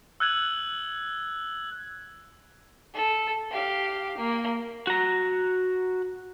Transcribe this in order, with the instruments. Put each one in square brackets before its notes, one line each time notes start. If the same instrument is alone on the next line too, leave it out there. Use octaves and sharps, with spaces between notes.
[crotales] E6 F#6 G#6 F#7
[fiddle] A4
G4 F5
A#3
[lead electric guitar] F#4 A#5